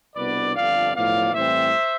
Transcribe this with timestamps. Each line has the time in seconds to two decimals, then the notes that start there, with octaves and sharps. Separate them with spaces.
0.15 C2 B2 B3 D4 B4 D5
0.54 G1 F2 D3 F3 D5 F5
0.94 B1 A2 F3 B3 D5 F5
1.32 A2 E3 G3 C4 C5 E5